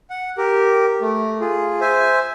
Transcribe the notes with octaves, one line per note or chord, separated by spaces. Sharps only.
F#5
G4 A#4
A3
F4 G#4
C5 E5 G#5